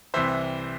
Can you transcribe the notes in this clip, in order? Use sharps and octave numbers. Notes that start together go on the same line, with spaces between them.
C2 C3 E3 C5 E5